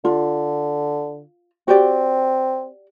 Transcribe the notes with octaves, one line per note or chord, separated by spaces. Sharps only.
D3 F4
C4 F#4 G4 D5